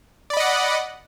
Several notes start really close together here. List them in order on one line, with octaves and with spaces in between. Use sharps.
D5 B5 D#5 F#5